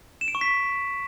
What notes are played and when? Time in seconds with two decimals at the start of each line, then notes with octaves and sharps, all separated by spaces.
0.21 E7
0.28 D7
0.35 C#6
0.41 B6